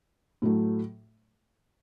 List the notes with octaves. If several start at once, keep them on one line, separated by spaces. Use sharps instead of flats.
A2 F#3 A3